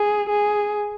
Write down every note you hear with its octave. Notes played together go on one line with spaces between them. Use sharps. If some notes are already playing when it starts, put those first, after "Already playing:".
Already playing: G#4
G#4